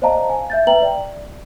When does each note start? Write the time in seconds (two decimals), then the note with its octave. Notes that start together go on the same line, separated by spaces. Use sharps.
0.02 C5 D5 D#5 F5 A5 A#5
0.29 F5 G#5
0.50 E5 G6 A6
0.67 B4 E5 G5 A#5 F#7
0.82 D5